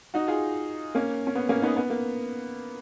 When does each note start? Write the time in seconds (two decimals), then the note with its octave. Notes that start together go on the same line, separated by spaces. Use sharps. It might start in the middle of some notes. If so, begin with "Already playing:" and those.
0.14 D#4 F#4
0.28 F4 G#4
0.95 A#3 C#4
1.27 C#4
1.35 B3
1.49 A#3 C#4
1.62 B3 D#4
1.77 B3
1.90 A#3